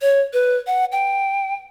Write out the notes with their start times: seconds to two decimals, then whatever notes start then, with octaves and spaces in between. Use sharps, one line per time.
0.02 C#5
0.33 B4
0.67 F#5
0.92 G5